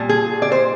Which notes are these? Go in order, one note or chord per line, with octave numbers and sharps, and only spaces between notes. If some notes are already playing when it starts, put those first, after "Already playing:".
Already playing: A#2 G3
G#4
D5
C5